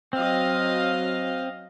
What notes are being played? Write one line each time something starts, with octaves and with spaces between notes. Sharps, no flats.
F#3 C4 D#5 F5